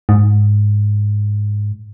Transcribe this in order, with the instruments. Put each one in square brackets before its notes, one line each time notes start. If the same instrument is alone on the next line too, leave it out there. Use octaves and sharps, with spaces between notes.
[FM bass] G#2